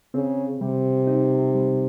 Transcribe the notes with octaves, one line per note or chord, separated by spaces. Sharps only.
C#3 C4
C3 G3
D#4
G3